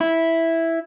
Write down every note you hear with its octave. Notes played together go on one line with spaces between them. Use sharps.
E4